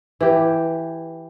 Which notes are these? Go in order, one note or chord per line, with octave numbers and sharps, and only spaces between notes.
E3 G4